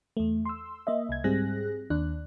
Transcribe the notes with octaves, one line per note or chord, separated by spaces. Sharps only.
E2 A3
C6 E6
A#3 D#5 E5
C2 G#6
G#2 G3 C4 G#4 F#6 A#6
D#2 D4 F#6